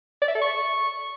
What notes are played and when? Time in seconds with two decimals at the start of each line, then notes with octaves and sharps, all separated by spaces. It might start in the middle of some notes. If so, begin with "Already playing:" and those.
0.21 D5
0.28 E5
0.35 A4
0.42 C#6